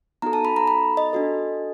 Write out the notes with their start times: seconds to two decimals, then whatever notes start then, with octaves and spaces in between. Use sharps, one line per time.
0.22 B3 D#4 F#4 A4 A#5
0.33 A5
0.45 B5
0.56 A#5
0.67 B5
0.97 D#5
1.13 D4 F#4 A4